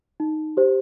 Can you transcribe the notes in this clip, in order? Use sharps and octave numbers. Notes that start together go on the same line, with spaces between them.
D#4
G4 C5